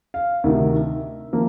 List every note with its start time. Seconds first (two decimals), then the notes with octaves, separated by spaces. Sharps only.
0.14 F5
0.44 D2 C3 D#3 E5
1.33 F3 A#3